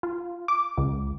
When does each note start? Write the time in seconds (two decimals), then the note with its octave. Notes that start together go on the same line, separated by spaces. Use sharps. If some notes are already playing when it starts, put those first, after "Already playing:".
0.03 F4
0.48 D6
0.77 C#2